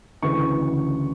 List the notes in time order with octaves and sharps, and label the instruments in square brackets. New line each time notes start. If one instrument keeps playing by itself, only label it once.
[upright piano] D2 C#3 E3 C#6